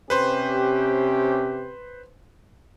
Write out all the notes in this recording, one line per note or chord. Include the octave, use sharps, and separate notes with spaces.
C3 C#4 G4 B4 C5 C6